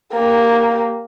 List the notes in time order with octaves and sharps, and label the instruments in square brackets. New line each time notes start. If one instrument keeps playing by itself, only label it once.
[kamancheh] A#3 G4